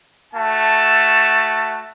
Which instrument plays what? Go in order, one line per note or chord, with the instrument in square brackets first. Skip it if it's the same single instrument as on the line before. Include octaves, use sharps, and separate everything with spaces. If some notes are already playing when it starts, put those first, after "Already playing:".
[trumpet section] A3 F#4 A5